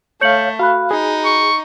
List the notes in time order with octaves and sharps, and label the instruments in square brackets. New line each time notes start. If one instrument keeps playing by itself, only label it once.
[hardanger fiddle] A3 [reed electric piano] C#5 F5 [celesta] G6 C#7 F#7
[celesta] F#4 B5 F#6 [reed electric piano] F5
[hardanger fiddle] D#4 [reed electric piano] G#4
[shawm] C#6